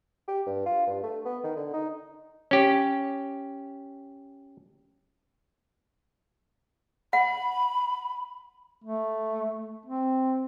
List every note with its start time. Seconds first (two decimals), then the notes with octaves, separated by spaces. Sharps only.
0.28 G4
0.46 G2
0.66 F4
0.87 G2
1.03 A3
1.25 B3
1.44 D#3
1.57 D3
1.73 D#4
2.51 C#4 G4
7.13 F#5 B5
8.84 A3
9.86 C4